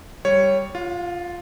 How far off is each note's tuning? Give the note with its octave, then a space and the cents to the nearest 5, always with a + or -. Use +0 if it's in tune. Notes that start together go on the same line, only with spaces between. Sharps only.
G3 +0 C#5 +0
F4 +0 F#5 -45